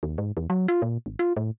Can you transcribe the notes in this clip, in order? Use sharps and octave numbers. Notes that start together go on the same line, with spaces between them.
D#2
G#2
E2
F#3
F4
A#2
G#1
F4
A2